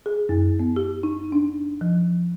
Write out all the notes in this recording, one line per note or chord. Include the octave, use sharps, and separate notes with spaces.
G#4
F#2
B3
G4
D#4
D4
F3